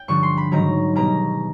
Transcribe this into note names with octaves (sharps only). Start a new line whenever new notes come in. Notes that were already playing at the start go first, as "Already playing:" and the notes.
Already playing: G5
G2 D3 F3 C#6
C6
B5
G#2 D#3 F#3 A#5
B2 G3 A#5